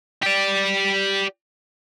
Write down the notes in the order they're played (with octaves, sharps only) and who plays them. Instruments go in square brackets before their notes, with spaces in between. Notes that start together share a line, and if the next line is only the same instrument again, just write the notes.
[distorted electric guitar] G4 D5